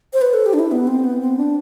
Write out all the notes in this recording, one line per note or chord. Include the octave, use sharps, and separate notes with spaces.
C5
B4
A4
G4
D4
E4
B3
C4
B3
C4
D4